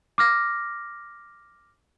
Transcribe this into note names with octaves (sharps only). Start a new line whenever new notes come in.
D6 F6 A#6